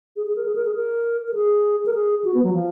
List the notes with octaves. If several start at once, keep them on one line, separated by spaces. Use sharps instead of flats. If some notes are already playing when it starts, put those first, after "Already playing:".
G#4
G#4
A#4
G#4
A#4
G#4
A#4
A#4
G#4
A#4
G#4
F#4
B3
F#3
F3